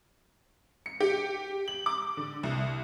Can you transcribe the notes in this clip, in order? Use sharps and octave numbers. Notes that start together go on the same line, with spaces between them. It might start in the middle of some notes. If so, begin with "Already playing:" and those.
C#7
G4
F#7
D6
D3
C2